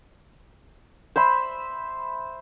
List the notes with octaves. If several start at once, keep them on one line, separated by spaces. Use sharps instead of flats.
C5 E5 B5